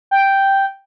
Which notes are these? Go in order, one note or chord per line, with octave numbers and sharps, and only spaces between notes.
G5